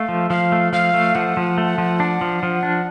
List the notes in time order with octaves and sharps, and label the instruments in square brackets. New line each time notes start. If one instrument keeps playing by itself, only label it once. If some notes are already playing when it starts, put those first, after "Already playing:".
Already playing: [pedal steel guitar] A3 [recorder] F5
[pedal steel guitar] F3
[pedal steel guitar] F3 [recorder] F5
[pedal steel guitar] A3
[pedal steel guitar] F3 [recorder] F5
[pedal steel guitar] A3
[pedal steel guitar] F3 [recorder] F#5
[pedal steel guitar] F3
A3
F3
D4
F3
F3
D4